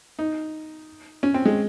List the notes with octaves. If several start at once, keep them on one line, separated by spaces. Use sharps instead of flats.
D#4
C#4
C4
G#3